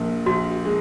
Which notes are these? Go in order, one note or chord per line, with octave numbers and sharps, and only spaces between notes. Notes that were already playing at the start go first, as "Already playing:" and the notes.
Already playing: A#1 A#2
A#1 F#4
G#3